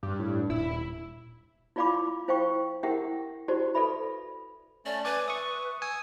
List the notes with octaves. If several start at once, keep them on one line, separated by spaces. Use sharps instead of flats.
G2
A2
D#1 E4
E4 F4 D5 F5 B5 D6
E4 C5 F5 G5 C#6
E4 G4 A#4 E5 F#5 G5
E4 F#4 G4 C5 D5
A4 B4 D5 E5 B5
A3 C#4 D5
B4 D5 G#5
E5 C#6 D#6
G#5 D#6 E6